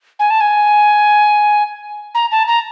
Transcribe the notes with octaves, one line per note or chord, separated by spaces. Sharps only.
G#5
A5
G#5
A#5
A5
A#5